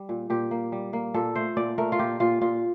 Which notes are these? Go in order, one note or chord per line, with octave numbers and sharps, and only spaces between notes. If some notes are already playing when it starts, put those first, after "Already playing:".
Already playing: G3
A#2
A#2 G4
A#3
G3
A#3
A#2 A4
A3 C5
A#2 D5
A3 A#4
F4
A#2 G4
A#2 F4
A#2 F4